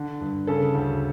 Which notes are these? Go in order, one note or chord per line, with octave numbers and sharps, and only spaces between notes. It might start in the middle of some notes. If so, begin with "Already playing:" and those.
Already playing: D3
G2
C#3 A4
D2